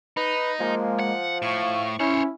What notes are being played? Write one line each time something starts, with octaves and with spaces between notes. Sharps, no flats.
D#4 B4
F3 G#3 A#3
F#5
A2 F5 C#6
C#4 E4 C5 C#5